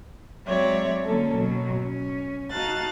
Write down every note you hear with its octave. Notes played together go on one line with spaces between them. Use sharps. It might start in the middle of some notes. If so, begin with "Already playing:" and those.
F#3 G#3 C4 C#5 D5 E5
D3 F#3 A#3 C#4 A4
B2 F#3
C#4
D#4 F#4 F5 A5 F#6 A6